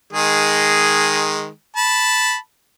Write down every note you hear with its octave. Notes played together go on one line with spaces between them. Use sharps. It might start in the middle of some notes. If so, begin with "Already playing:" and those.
D#3 G#3 G#4
A5 B5